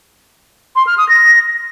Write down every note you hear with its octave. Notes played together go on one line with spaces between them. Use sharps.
C6
F6
D#6
A#6